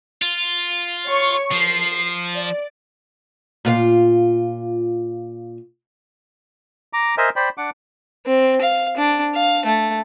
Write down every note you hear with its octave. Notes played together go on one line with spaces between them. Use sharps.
F4
C#5 C#6
F3 C7
D5
A#2 F4 F5
A#5 D6
A#4 C5 D#5 E5 G#5
C5 D5 G5 B5
D4 F#5 D6
C4
F5
D4
F5
A3